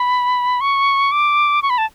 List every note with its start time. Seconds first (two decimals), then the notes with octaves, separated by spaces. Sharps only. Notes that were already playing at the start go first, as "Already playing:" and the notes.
Already playing: B5
0.61 C#6
1.12 D6
1.63 C#6
1.70 B5
1.78 A5